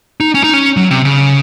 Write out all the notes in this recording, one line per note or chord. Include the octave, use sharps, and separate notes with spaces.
D#4
C#4
D#4
C#4
F#3
C3
C#3